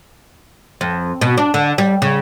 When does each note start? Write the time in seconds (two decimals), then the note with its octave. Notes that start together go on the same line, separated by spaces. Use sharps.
0.81 F2
1.21 B2
1.38 D4
1.54 D3
1.78 G3
2.02 C#3